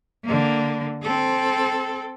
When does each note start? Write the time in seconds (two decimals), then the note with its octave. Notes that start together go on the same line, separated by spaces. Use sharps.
0.25 D3 A#3
1.03 C4 A4